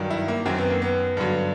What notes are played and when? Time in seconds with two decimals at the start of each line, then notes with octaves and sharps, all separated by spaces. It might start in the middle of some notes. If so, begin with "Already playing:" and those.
Already playing: G2 D#3 F#3
0.10 E4
0.28 A#3
0.46 F#2 D#3 F#3 C4
0.58 B3
0.70 A#3
0.82 B3
1.17 G2 D3 F#3